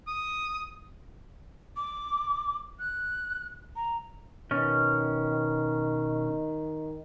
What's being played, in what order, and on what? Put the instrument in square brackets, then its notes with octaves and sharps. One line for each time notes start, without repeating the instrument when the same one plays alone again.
[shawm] D#6
[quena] D6
F#6
A#5
[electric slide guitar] B2 C#4 [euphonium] D#3